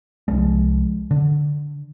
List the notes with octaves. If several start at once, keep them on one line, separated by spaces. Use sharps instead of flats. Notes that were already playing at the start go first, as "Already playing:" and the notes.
C2 F3 G#3
D3